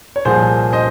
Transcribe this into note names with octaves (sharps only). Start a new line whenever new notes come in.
C#5
C2 A#2 F3 G#4 C5
C5 D#5